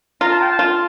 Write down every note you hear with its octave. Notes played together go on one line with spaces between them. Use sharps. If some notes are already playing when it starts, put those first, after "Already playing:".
F4 A#5
A5
G5
A5
F4